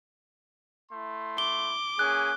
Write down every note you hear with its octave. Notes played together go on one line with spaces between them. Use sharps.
A3 E4 C6
D6 G7
A#3 C#4 G#4 F#6